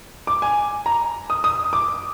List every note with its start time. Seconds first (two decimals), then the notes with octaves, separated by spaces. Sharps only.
0.27 D6
0.42 G#5
0.86 A#5
1.30 D#6
1.44 D#6
1.73 D6